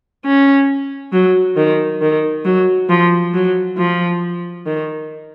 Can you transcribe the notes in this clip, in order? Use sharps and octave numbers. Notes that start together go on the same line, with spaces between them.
C#4
F#3
D#3
D#3
F#3
F3
F#3
F3
D#3